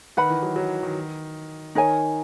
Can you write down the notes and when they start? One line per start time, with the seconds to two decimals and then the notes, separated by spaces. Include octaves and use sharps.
0.17 D#3 B4 F#5 B5
0.30 E3
0.43 F#3
0.56 F#3
0.83 D#3
1.75 D#3 D#4 A#4 C#5 G#5